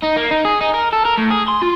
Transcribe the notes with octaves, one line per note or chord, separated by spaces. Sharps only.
D#4
A#3
D#4
G#4
D#4
A#4
A4
A#4
A2
G#4
C6
F4